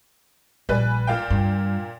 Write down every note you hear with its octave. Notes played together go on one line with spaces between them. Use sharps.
A#1 G3 B4 G#5
A#2 F5 G5
G2